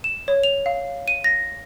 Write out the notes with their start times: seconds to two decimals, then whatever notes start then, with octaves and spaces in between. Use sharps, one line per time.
0.04 E7
0.28 C#5
0.43 F7
0.66 F5
1.08 D#7
1.24 A#6